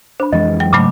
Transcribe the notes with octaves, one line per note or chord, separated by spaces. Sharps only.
D4 C5 B5
F2 E3 G#3 D#5
F#3 G5
G#2 C#3 F#3 A3 B5 D6